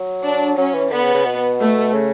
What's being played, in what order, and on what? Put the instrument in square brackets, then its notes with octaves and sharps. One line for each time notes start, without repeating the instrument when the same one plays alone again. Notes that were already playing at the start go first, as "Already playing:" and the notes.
Already playing: [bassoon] F#3
[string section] D4
[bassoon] F#3 [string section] C#4
[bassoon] E3
[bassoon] D3 [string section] B3
[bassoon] C#3
C#3
B2
[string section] A3
[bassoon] C#3